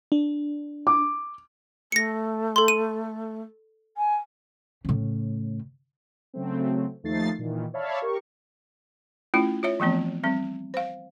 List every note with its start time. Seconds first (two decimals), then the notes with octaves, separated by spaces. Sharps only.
0.12 D4
0.87 D6
1.92 A3 A#6 C#7
2.56 A4 C6
2.68 D#7
3.97 G#5
4.85 A2 C#3
6.34 C#3 F#3 A3 C4
7.03 D#2 F3 A3 D#4 A6 C7
7.39 A#2 D#3 E3
7.74 C#5 D5 E5 F5 A5 B5
8.02 G4 A#4 C#6
9.34 A3 C#4 E4 F4
9.63 F4 C#5 E5
9.80 E3 F3 A3 B3 C4
10.24 G3 C4
10.74 C5 F5